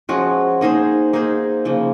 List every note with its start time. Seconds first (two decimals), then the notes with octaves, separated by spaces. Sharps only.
0.09 F3 G#3 C#4 F#4
0.61 A#3 D#4 G#4 C5
1.13 A#3 D#4 G#4 C5
1.65 C#3 F3 A#3